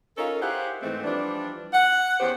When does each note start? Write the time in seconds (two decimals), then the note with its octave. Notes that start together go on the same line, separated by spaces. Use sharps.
0.17 C#4 D#4 F4 A4 A#4
0.41 E4 G4 G#4 C5 F5 F#5
0.82 G#2 E3 G#3 A3 C4
1.04 E3 F3 G3 D4
1.73 F#5
2.20 E2 B3 C#4 G4 C5